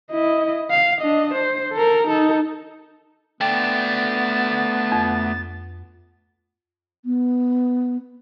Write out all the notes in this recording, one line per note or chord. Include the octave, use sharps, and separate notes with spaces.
E4 D#5
F5
D4 D#5
C5
A4 A#4
D#4 A4
A3 B3 D4 G5 A6
F2
B3